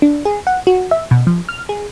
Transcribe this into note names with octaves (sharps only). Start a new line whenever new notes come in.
D4
G#4
F#5
F#4
E5
B2
F3
F6
G#4